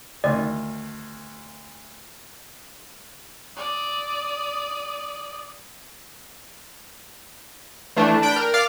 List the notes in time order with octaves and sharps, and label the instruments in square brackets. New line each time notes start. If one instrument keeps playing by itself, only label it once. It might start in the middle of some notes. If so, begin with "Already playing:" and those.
[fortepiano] D2 D#3 [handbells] D5
[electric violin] D5 D#6
[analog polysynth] E3 A3 D4
D4 G5 B5 D7
A#4
D5 F5 D6 F6